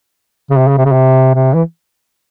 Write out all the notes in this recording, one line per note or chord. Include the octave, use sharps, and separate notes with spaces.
C#3
C3
C#3
C3
C#3
C3
C3
E3